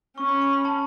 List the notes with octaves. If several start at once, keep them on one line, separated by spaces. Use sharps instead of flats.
C#4 C#6
B5
C#6
B5
A5